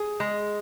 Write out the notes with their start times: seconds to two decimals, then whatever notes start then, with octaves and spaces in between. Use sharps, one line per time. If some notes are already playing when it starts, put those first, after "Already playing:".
Already playing: G#4
0.20 G#3